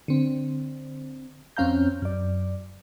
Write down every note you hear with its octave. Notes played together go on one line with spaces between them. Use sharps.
D3 C4
F2 C4 C#4 F5 A#5 G6
F#2 D5